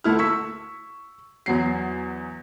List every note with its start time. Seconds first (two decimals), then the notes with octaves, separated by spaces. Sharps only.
0.04 D2 A3 E4 F6
0.19 C#6 E6 B6
1.46 E2 F#3 C7